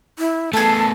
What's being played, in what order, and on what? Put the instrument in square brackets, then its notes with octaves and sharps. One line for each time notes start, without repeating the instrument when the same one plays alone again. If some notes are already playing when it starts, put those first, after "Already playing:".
[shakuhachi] E4
[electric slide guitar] A3 B3 [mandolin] G#4 A4 [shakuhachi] A5